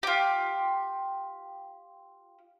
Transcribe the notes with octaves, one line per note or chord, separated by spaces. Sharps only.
F4 G4